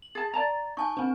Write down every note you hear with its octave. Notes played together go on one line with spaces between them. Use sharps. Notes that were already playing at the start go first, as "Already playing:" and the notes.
F#7
G#4 A5 A6
D5 A5 A#5
D#4 G#5 A5 C#6
C4 D4